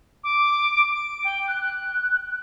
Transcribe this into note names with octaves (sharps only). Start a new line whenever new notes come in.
D6
D7
G5
F#6